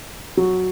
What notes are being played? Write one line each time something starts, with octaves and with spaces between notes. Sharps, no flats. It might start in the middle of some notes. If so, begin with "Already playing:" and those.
F#3